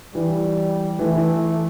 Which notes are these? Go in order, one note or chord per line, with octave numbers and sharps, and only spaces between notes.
E3 G3
E3 A3
E3